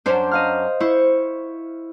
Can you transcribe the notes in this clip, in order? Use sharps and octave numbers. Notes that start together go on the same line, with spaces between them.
F#2 C#4 D4 C5
D#5 F5 F6
E4 C5 C#6